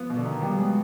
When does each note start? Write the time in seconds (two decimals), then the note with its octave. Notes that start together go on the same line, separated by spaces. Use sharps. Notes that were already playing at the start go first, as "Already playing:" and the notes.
Already playing: F3 B3
0.10 B2
0.17 D3
0.26 D#3
0.41 F3 G3 B3
0.57 F#3 G#3